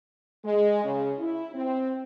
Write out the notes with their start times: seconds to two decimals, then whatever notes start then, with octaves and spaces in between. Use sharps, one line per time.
0.44 G#3
0.84 C#3
1.19 E4
1.54 C4